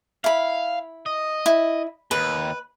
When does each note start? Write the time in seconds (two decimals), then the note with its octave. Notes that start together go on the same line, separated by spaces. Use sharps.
0.24 E4 F5 B5
1.06 D#5
1.46 E4
2.11 D#2 B4